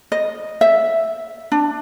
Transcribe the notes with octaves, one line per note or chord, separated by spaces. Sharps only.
D#5
E5
D4